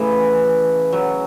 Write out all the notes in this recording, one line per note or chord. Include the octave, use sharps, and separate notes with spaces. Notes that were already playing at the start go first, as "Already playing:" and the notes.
Already playing: A2 C#3 E3
F#3